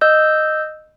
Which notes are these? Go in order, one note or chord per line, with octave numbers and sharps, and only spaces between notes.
D#5 E6 G6